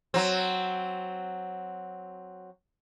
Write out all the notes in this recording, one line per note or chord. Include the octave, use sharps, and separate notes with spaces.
F#3 C4